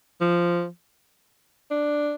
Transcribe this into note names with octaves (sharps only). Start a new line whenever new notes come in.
F3
D4